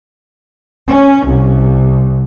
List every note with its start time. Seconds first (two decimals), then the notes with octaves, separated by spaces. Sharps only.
0.86 C#4
1.25 C2